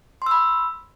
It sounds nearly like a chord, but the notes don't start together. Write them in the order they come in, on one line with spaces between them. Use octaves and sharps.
C6 E6 B5